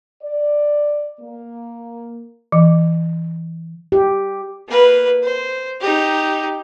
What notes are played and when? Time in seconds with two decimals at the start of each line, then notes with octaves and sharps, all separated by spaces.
0.22 D5
1.20 A#3
2.52 E3
3.92 G4
4.68 A#3 B4
5.23 C5
5.81 D#4 G4